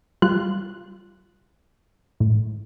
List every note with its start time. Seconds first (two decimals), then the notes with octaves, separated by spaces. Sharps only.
0.22 G3 F4 F#6
2.20 A2